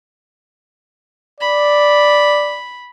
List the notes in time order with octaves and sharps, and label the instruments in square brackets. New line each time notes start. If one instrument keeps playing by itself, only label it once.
[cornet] D5 [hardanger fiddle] B5